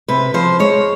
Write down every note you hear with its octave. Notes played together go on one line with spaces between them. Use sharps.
C3 B4
F3 C5
G#3 C#5